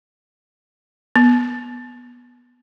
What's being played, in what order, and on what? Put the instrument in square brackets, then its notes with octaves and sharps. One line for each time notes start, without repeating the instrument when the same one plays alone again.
[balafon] B3